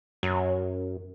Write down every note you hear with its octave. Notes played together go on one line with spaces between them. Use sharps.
F#2